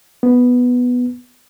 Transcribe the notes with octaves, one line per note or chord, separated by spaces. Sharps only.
B3